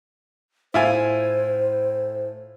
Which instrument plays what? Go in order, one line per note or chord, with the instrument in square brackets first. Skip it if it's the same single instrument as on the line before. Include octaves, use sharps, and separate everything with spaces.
[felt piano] A2 [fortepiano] E4 F4 G#5 [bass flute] C5